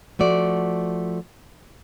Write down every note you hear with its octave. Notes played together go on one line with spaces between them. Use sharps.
F3 A3 F#4 D5